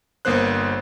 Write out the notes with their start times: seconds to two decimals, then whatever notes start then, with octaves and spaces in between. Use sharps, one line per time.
0.25 G1 A#3 B3 C5 F#6